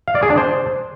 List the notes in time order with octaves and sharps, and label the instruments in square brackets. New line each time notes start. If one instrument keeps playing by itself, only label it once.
[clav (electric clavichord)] F5
D5
G#4
D4
C5